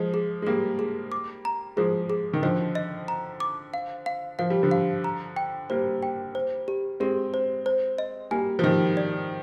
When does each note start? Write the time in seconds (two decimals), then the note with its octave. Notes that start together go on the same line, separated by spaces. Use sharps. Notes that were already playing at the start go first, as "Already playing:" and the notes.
Already playing: F3 G#3 D#5
0.14 G#4
0.42 G#3
0.46 G3 A#3 G#4
0.79 G#4
1.12 D6
1.45 A#5
1.77 F3 G#3 G#4
2.10 G#4
2.34 D#3
2.42 D3 F3 D#5
2.75 D#5
3.08 A#5
3.40 D6
3.74 F5
4.06 F5
4.39 F3 F5
4.50 G3
4.63 D3 F3
4.71 F5
5.04 A#5
5.36 G5
5.70 G3 A#3 C5
6.03 G5
6.35 C5
6.68 G4
7.00 G#3 C4 G4
7.34 C5
7.66 C5
7.98 D#5
8.31 G3 A#3 G#5
8.59 F3
8.64 D#3 G3 D#5
8.97 D5